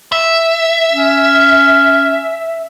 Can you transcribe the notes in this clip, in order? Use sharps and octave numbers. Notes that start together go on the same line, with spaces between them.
E5
C#4